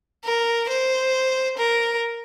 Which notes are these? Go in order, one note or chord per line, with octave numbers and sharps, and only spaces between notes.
A#4
C5
A#4